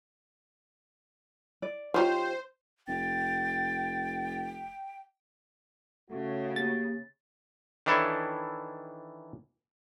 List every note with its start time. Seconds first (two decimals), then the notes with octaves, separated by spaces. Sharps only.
1.62 D5
1.94 F3 C#4 D#4 F4 G4 C5
2.88 F1 G5 A6
6.11 C#3 A3 F#4
6.56 A#3 G4 G#4 A6
7.86 D#3 E3 D4 E4 A4 C#5